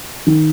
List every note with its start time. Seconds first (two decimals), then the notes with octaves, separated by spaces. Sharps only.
0.27 D#3